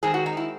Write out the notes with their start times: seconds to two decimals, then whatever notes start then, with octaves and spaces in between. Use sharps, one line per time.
0.03 D#3 G#3 C4 G#4
0.14 F#4
0.26 D#4
0.37 E4